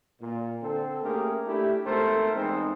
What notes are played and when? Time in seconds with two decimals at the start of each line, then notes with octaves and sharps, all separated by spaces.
0.21 A#2
0.62 D3 C4 A4
1.03 A3 A#3 C#4 G4 G#4 A#4
1.46 A3 D4 E4 G4
1.85 G#1 A3 B3 A4 A#4 C5
2.36 E2 G#3 B3 C4 D#4